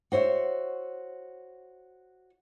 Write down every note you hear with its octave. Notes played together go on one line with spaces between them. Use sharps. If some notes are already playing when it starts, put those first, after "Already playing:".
F#4 C5 C#5 E5